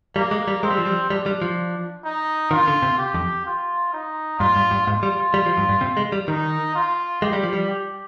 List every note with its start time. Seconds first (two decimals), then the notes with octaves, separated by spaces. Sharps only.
0.16 G3 A#3
0.31 G#3
0.48 G3
0.63 G#3 C4
0.70 G3
0.78 F3
0.86 G3
1.10 G3 D4
1.26 G3
1.42 F3
2.04 D#4
2.51 D#3 F4
2.68 D3
2.82 C3
2.98 G4
3.14 F2
3.46 F4
3.93 D#4
4.39 G2 F4
4.56 G2
4.71 G2
4.87 G#2 F4
5.03 G3
5.34 G3
5.46 F3
5.57 G2
5.69 G2
5.81 C3
5.97 G#3
6.12 G3
6.28 D#3 D#4
6.75 F4
7.22 G#3 G4
7.33 G3
7.43 F3
7.53 G3
7.69 G4